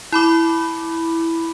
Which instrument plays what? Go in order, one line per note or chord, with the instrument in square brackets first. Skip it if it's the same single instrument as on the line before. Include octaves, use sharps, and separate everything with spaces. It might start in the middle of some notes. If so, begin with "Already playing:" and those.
[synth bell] E4 B5 D6